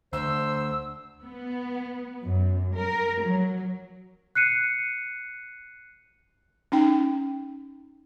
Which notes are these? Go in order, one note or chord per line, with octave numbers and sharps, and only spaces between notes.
D2 C5 E6
B3
F#2
A#4
F#3
F#6 C7 C#7 D#7
C#4 D#4 G5